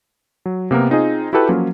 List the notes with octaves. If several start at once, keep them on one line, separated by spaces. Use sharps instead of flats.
F#3
C3 A#3 B3 A#4
C4 D#4 F4 G#4 D#5
E4 F#4 G4 A4 B4 G5
F3 F#3 A#3 C#4 F4